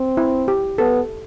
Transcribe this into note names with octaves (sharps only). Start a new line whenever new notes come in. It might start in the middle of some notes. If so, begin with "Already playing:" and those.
Already playing: C4
E4
G4
B3 A4